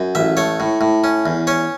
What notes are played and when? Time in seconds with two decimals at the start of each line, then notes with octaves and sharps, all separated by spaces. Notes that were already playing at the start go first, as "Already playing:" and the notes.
Already playing: F#2
0.15 A1 E5
0.37 A3 C#5
0.60 A2
0.81 A2
1.04 C#4
1.26 E2
1.47 C#4 C#5